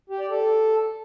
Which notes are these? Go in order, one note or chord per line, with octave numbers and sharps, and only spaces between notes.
G4
D5
A4